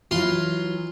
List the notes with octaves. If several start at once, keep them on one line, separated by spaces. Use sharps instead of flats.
E3 F#3 F4 C6